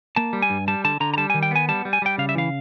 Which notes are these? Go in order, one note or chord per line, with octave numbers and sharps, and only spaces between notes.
A#3 A5
G3
G#5
G2
G3 A5
D3 A5
D3 A#5
A#5
G3 A5
D#3 G#5
G5
B3 G#5
G3 A5
G3
G#5
G3 G5
C#3 F5
E5
E3 F5